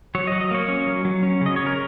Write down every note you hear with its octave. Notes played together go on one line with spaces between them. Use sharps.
F#3 C#5
F#3 D#5
D#5
A#3 C#5
C#4
F#3
F#3
C#4
C#3 D#5
C#3 C#5
A#4